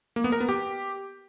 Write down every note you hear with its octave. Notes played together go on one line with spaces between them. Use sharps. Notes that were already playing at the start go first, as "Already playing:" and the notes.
A#3
B3
A#4
B3
G4